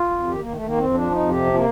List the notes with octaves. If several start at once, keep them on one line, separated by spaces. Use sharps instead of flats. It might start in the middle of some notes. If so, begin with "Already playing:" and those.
Already playing: F4
F2
D#3 G4
D#3 A#3
A3
D#3 A#3
F2 C4
F3 D4
F2 D#4
C3 G4
F3
A#3